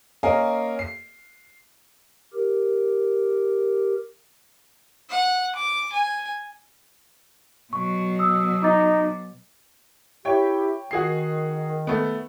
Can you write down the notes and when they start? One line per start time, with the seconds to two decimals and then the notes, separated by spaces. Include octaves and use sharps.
0.23 A#3 C#4 A#4 D#5 F5 G#5
0.79 C7
2.34 G4 A#4
5.10 F#5
5.55 D6
5.92 G#5
7.73 B2 F#3 C#6
8.19 D#6 E6
8.63 D#4 D6 A6
10.25 E4 G4 C#5 G5
10.91 D#3 F#4 G#4 C7
11.87 A3 B3